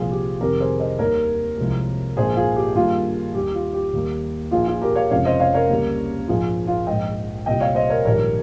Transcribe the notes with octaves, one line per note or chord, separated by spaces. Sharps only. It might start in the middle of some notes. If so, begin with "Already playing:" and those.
Already playing: C2 A#2 F3 F4 G#4
G4
F1 F2 C3 D#3 G3 G4 A#4
G#4 C5
C5 D#5
D#2 D#3 G3 A#3 A#4 C#5
C2 C3 F3 G#3
A#1 G#2 F3 A#3 G#4 C5
F4 G#4
G4
G2 D#3 G3 A#3 F4 G#4
D#2 D#3 G3 G4
F4
G4
D#2 D#3 G3 A#3
A#1 A#2 F3 F4 G#4
F4 G#4
G4 A#4
C#5 F5
F1 F2 C#3 F3 G#3 C#5 F5
C5 D#5
C#5 F5
A#4 C#5
C#2 C#3 G3 A#3
A#1 G#2 F3 G#3 F4 G#4
F4 G#4
A#1 G#2 F3 G#3 D#5 G5
C2 A#2 G3 D#5 G5
C#5 F5
C5 D#5
A#4 C#5
A#1 G#2 D#3 G3 A#4 C#5